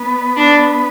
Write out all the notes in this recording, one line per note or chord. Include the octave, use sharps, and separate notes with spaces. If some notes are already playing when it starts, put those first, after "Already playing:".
Already playing: B3
D4